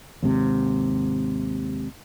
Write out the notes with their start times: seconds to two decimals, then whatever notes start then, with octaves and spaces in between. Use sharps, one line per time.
0.22 D#2 G#2 C3